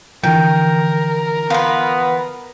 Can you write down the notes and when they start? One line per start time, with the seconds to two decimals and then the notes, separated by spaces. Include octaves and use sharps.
0.23 D3 E3 F3 A#4 G5
1.50 B3 F4 B4